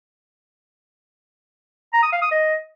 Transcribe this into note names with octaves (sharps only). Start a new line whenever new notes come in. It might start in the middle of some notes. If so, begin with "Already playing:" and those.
A#5
D#6
F5
D#6
D#5